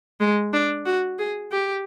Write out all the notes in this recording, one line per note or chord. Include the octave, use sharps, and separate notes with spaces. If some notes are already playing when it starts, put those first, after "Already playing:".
G#3
D4
F#4
G#4
G4